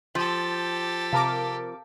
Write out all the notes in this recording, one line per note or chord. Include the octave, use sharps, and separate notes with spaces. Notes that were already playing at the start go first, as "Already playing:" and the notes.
F3 G4 A4
C3 A#4 F5 A5 D6